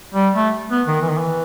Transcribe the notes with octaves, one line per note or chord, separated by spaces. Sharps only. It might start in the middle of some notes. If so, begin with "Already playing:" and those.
G3
A3
B3
D#3
E3
D#3
E3